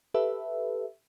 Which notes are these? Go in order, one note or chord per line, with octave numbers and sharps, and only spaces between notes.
G4 A4 B4 E5